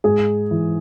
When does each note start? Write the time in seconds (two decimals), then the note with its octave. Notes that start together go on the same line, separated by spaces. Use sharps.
0.04 G#2 G#4
0.51 E3